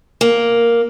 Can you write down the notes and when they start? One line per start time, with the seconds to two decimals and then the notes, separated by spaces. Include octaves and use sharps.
0.21 A#3